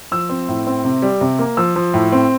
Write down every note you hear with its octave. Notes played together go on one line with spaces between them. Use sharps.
F3 E6
C4
A2
C4
C3
G3
C3
A#3
F3 E6
F3
A2
C4